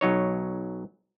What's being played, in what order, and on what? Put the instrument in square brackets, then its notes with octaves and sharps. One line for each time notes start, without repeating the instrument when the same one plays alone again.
[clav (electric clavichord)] B1 F#3 D#4 C#5